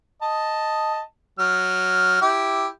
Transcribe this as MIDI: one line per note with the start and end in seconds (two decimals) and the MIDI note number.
0.22 1.00 75
0.22 1.00 81
1.39 2.20 54
1.39 2.20 89
2.22 2.67 64
2.22 2.67 67